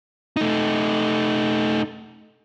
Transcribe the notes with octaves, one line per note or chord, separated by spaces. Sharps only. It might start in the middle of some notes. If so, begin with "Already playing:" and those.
A3 D#4